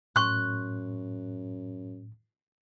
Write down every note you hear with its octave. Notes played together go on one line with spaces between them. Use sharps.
F#2 A2 C6 C#6 F#6